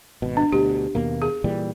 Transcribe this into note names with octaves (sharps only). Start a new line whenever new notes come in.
G#1 B2
D4
D2 B2 G4
D#2 B2 A#3
G#4
A#2 E3 G3